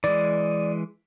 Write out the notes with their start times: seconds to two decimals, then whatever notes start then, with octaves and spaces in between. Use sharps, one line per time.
0.04 E3 G#3 D5